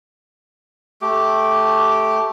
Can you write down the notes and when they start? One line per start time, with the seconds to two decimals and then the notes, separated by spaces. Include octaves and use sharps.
1.02 A3 G4 D6